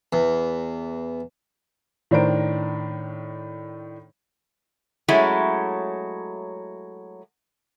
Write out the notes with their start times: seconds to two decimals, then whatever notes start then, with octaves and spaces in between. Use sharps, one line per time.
0.13 E2
2.11 A2 D#3 D4 C5 A#5 D7
5.08 F#3 G#3 A3 C#4 E4